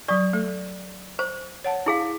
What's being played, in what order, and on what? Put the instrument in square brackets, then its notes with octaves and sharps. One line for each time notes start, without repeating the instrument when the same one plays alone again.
[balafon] F#3 C#6 [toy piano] D5
[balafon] A3 A4
[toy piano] C5
[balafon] C#5 F#5 A5
[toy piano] E4 G#4 F5